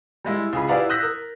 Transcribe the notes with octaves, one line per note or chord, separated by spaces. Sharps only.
G3 G#3 E4
C#2 G#4 B5
E4 G4 B4 D5 F5 F#5
D#6 E6 F#6 G6 A#6 B6
A#4